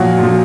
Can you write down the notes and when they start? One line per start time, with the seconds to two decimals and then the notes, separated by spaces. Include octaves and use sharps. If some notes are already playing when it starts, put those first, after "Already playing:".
Already playing: A#2 F3 F#3 F#4
0.18 A#2 F3